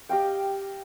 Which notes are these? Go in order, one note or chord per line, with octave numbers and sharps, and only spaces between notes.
G4 D#5 F5 G5